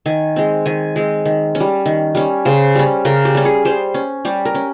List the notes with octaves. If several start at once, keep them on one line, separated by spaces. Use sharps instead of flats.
D#3 G#5
G#3 C4
D#3 G#5
G#3 C4
D#3
C#4
G3
D#3
G3 C#4
C#3 C5
G3 C#4
C#3 A#4
G4
G3 C#4
G#4
G3 C5
C#4
G3 G4
A#4
C#4